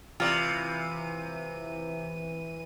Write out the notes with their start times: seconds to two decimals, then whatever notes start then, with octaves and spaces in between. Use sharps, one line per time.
0.20 C3 E3 F4 D5 D#7